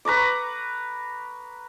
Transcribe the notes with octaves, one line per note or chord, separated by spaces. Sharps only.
B4 A#5 C#6 D6